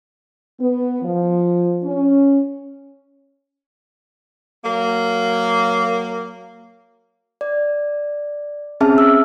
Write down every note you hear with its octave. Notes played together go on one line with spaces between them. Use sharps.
B3
F3
C#4
F#3 A#3
D5
C4 C#4 G#4 E5 A5 F6
E6